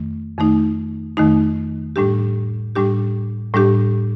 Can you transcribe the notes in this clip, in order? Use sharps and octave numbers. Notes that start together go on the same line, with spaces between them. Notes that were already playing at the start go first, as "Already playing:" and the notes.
Already playing: F2 D#3 A3
F2 D#3 A3 D#4
F2 D#3 A3 D#4
A2 G3 D4 G4
A2 G3 D4 G4
A2 G3 D4 G4